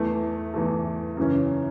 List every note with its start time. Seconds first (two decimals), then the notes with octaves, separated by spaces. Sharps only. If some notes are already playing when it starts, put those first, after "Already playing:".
Already playing: E2 E3 A3
0.54 E2 E3 A3
1.17 F#2 C#3 E3 C#4